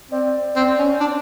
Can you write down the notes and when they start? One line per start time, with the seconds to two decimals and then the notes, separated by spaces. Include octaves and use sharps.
0.11 C4 D5
0.56 C4
0.79 C#4
1.00 D4